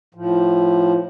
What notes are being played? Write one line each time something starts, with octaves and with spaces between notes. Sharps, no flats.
A2 F3